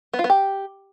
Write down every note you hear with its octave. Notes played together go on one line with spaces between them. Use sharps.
B3
F4
B3
G4